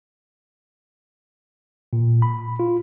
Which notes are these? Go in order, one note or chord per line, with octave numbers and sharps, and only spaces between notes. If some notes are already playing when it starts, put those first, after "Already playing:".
A#2
B5
F4